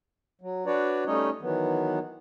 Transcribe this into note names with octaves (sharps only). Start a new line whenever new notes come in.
F#3
D4 F#4 B4 C#5 D5
G3 A3 C#4 D#4 C#5 D#5
D#3 E3 F#3 B3